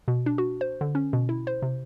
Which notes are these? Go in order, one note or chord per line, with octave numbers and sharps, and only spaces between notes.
B2
D4
F#4
C5
D3
C#4
B2
E4
C5
C3